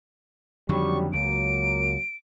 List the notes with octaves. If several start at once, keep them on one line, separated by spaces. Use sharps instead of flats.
F2 D3 D#3 F#3 G3 C#6
C#2 F#3 A#3 D7